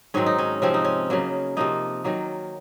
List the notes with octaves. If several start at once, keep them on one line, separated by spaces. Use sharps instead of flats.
G#2 D#3 F#3 C4 C#4
D#4
C#4
C3 F3 C4 C#4
D#4
C#4
C#3 F#3 A#3
C3 F3 A#3 D#4
D#3 F#3 A#3